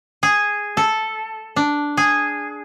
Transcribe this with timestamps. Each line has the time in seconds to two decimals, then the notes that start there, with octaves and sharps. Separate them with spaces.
0.23 G#4
0.77 A4
1.56 D4
1.97 G#4